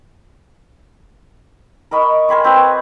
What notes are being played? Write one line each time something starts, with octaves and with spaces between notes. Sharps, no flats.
A#4 D#5 B5 C#6
A#4 G#5 B5 C6
C4 F#4 B4